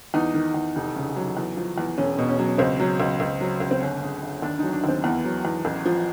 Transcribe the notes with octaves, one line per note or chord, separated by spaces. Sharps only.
E2 D#4
D#3
E2
F1 D#4
C#3
F#3
E2
F3
E2
E1 C#4
B2
C#4
F#3
C#2 C4
F#3
C#2
C#2
F#3
C#2
C4
G1 C#4
C#3
G1
D#2 D4
F#3 D#4
D4
D#2 C4
E2 B3
F#3
E2
A1
F3